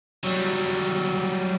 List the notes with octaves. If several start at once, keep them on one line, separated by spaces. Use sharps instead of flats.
F#3 G3